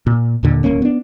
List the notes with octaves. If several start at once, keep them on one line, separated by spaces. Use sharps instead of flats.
A#2
D#2 A#2 D3
D1 G#1 A#3 C#4
B3 D4